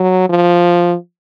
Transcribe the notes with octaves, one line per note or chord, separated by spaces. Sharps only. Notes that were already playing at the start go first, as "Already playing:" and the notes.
Already playing: F#3
F3